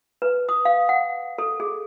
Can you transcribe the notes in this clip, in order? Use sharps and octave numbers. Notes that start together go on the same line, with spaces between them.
B4
D#6
F5
F#5
A4
G#4